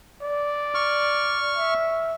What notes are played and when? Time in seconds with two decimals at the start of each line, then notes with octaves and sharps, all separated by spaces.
0.22 D5
0.75 C#6 F6
1.56 E5